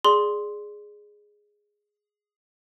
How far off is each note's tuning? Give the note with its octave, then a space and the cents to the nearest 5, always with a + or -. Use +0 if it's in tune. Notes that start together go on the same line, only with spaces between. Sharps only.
G#4 +0 D5 +0 C6 +0